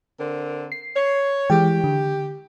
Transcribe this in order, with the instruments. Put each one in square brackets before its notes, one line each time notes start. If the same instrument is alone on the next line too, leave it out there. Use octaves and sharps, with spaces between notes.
[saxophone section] D3 C4 A#4
[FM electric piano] C7
[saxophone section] C#5
[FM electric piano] E3 G#3 G5 [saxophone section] G4
[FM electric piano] D3